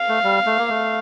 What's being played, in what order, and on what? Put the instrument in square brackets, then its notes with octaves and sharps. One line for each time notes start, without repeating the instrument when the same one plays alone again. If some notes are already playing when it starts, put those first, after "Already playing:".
Already playing: [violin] F5
[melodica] A3
G3
A3
A#3
A3